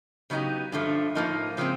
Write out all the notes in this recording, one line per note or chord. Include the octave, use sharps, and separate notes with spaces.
C#3 F#3 B3 D#4 G4
G2 D3 F3 A3
A2 F3 A#3 D#4
C#3 F3 G#3 C4